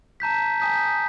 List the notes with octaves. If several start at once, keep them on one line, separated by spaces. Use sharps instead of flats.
A5 A#5 G6 B6
G#5 A5 D#6 G6 B6
G6